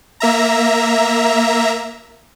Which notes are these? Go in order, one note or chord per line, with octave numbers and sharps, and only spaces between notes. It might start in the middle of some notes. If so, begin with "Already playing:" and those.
A#3 E5 A#5